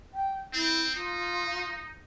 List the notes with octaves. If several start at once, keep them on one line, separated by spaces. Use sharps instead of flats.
G5
C4 E4
D#4 F4